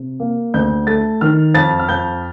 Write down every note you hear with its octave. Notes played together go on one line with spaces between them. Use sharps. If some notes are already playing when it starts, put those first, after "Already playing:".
Already playing: C3
A#3
D2 G6
A3 A6
D#3 F6
F2 A6
F6
F2 G6